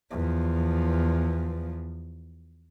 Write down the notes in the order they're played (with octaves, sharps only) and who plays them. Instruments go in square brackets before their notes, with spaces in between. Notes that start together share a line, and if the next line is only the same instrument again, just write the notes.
[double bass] E2 F3